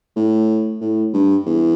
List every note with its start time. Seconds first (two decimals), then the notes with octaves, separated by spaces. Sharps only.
0.16 A2
0.81 A2
1.14 G2
1.46 E2